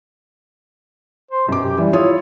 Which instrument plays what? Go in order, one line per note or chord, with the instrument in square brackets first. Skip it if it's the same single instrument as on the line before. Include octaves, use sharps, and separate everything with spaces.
[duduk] C5
[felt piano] F#2 D6 [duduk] B2
[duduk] G4
[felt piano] E3 [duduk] G3
[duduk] E4 [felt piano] F4 C#5 D#6